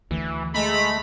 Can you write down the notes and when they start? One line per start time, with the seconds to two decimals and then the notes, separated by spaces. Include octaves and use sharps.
0.11 D2 E3
0.55 G#3 A3 A#5 B5